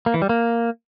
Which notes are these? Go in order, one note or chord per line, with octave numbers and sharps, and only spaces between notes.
A#3
E3
G3
A#3